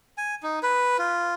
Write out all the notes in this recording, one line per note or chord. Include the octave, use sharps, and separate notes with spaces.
G#5
D#4
B4
F4